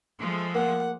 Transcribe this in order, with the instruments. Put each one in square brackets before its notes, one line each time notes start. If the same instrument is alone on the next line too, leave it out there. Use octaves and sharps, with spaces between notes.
[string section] F3 G#3 A3
[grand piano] A#3 [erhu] F#5